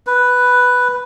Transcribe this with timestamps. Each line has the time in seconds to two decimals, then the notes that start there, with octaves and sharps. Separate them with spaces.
0.07 B4